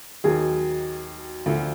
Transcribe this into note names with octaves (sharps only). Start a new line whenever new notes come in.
D#2 D#3 F#3 G#4
D2 D3 F3